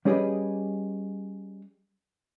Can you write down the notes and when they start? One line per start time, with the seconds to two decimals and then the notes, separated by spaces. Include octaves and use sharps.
0.05 G3 C#4 G4 G#4 B4 D#5